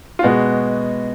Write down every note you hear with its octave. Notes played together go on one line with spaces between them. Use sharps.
F4
B2 G#3 B3 F#4